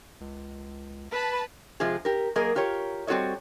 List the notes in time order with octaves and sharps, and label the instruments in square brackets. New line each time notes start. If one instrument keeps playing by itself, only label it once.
[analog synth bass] C#2
[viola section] B4 A5 B5
[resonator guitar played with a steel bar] C3 F3 G#3 G#4
G4 A#4
F#3 A#3 G#4 A#4 D#5
F4 G4 A#4 C#5
G3 C4 F#4 A4 C#5 D#5